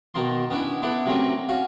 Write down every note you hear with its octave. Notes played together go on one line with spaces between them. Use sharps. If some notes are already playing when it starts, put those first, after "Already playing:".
B2 D#3 A#3 A5 C6
B3 C#4 D4 E4
B3 D4 E4 A4 B4
C3 F#3 A3 A#3 C4 C#4
C#4 F#4 F5